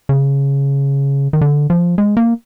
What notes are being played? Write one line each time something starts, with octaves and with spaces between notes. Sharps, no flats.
C#3
D#3
D3
F3
G#3
A#3